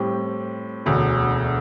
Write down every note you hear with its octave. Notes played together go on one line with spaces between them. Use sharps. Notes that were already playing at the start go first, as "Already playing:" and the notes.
Already playing: A2 G3 C4 G4
E1 D2 D3